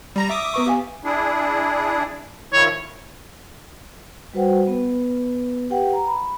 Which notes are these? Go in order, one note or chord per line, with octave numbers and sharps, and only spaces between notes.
G3 A#5 A#6
E5 D6 D#6
B3 B4 C#6
G4 F5 G#5
D4 E4 G#4
D#3 F3 E4 C#5
G3 F#4 B4 C5 F#5 G5
B3 B4
G4 B4 F#5 G5
A#5
B5